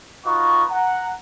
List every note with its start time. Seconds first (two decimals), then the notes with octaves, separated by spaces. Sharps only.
0.25 D#4 F4 F#4 B4 C#6
0.69 F#5 A#5